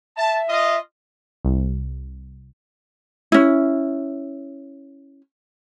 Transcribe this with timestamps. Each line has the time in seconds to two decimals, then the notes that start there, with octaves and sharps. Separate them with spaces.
0.17 E5 A5
0.47 F4 D#5
1.45 C2
3.32 C#4 E4